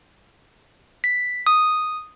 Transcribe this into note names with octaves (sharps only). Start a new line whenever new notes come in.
B6
D#6